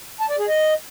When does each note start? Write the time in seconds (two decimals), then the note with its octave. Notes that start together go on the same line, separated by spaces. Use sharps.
0.20 A5
0.30 D5
0.39 G#4
0.48 D#5